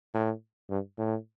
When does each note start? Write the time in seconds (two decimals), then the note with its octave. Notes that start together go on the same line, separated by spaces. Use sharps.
0.14 A2
0.70 G2
0.98 A2